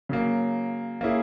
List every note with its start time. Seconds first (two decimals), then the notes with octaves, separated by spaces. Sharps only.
0.09 C#3 F#3 A#3
1.01 A#3 C#4 E4 G#4